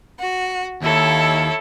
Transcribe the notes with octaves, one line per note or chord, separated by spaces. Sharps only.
F#4
D#2 E4 A4 C#5